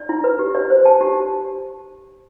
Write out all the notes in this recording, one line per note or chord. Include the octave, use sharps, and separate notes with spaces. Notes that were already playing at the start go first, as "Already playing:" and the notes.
Already playing: D5
E4
B4
G4
D5
C5
A5
G4